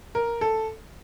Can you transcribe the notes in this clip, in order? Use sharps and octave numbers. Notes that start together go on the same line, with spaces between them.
A#4
A4